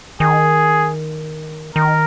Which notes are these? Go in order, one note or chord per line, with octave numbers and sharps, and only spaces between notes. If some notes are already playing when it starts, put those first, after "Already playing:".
D#3 G#4
D#3 A#4